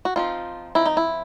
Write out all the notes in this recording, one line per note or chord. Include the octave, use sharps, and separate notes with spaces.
F#4
F3 G#3 C4 D#4 F4
F3 G#3 C4 D#4 E4
D#4
E4